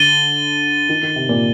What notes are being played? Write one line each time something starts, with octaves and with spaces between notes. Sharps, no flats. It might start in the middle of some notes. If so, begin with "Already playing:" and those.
Already playing: D3 A6 D#7 G7
D#3
D#3
C3
A#2